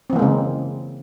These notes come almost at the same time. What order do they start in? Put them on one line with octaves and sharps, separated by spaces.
C4 E3 A#3 G#3 C#3